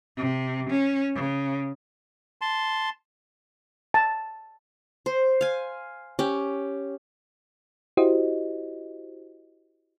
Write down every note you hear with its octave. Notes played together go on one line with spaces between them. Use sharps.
C3
C#4
C#3
A5 C6
A5
C5
F5 G#5
C#4 G4
E4 F#4 G4 C5 D#5